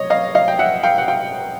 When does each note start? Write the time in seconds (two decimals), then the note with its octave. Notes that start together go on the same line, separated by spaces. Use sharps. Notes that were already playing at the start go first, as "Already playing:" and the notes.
Already playing: C#5 D#5
0.10 D#5 F5
0.35 D#5 F5
0.48 G5
0.59 E5 F#5
0.83 F5 G5
0.98 F#5
1.08 F5 G5